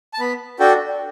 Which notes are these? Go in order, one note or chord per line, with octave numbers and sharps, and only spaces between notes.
A5
B3 B5
D4 F#4 A4 G5